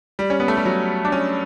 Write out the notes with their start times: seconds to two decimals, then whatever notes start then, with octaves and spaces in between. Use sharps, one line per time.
0.19 G3
0.30 C#4
0.40 B3
0.48 A3
0.57 G3
0.66 F#3
1.05 D4
1.12 C#4